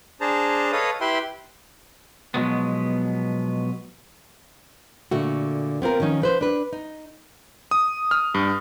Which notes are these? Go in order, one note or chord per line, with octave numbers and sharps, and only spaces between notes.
D4 G#4 C5 A5 A#5
A4 B4 C#5 D#5 F5 D#6
E4 G4 B4 E5 G5 C6
B2 F3 F#3 G#3 B3
A#2 D3 A3 F#4
B3 C4 F4 A#4
D#3 F3 C#4 D#4
F3 B4 C5
D4 B4
D#4
D#6
F6
G2